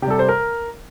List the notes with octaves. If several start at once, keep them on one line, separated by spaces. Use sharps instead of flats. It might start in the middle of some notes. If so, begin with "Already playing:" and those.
C3 G4
G3 A4
C5
A#4